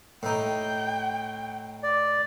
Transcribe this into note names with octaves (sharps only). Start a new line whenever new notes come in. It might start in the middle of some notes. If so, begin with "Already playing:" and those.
A2 D#4 G5
D5